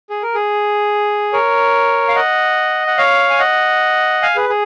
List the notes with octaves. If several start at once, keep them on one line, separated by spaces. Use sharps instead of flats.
G#4
A#4
G#4
A#4 C#5
F5
D#5 F#5
F#5
C#5 F5
G#5
D#5 F#5
F5 G#5
G#4 B4
G#4